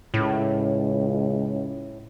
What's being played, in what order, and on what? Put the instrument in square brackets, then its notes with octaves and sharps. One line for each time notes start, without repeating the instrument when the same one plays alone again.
[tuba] C#2 [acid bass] A2